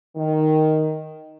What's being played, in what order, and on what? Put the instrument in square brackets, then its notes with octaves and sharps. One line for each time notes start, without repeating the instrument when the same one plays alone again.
[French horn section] D#3